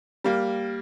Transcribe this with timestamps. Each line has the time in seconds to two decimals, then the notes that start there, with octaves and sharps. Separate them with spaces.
0.24 G3 A#3